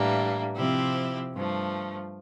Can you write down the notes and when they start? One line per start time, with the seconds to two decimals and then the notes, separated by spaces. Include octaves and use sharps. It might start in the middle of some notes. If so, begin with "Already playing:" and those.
Already playing: A2 E3 G3 A#3 D4
0.55 C3 F3 C4 E4 G4
1.33 G2 F3 A3